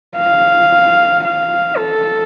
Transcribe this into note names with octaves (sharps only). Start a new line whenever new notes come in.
F5
F5
A4